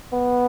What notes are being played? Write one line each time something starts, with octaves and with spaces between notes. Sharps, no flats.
B3